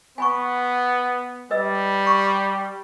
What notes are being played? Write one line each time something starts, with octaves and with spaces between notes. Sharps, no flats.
B3 G#5 B5 C#6
G3 B4 D#5 E6
C#6